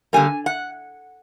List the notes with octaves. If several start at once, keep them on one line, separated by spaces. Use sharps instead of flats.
D3 G3 A#3 G#5
F#5